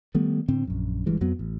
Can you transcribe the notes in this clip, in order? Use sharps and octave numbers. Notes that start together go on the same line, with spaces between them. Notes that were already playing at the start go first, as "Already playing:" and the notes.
D#3 G3 A3 B3
A2 D3 C4
A#1 F#2
G1 G2 E3 G#3
F2 F#3 B3
A1